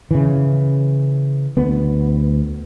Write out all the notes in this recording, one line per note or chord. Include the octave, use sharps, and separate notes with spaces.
C#3 E3
D2 B3